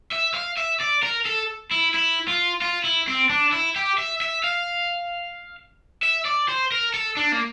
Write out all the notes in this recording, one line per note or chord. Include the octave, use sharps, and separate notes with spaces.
E5
F5
E5
D5
A#4
A4
E4
E4
F4
F4
E4
C4
D4
E4
G4
E5
E5
F5
E5
D5
C5
A#4
A4
D4
A#3